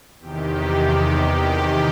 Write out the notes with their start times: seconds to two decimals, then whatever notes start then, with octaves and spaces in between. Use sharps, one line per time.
0.20 E2 C3 D#3 G4
1.41 G4